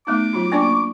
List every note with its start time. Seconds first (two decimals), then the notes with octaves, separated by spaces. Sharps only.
0.07 A3 B3 D#4 D6
0.33 F#3 F4 F#4
0.52 A#3 C#4 D4 D5 C#6